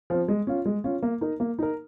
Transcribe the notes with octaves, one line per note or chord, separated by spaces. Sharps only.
F3 C4
G#3
C#4 F4
G#3
C#4 F4
A#3
D#4 A#4
A#3
D#4 A#4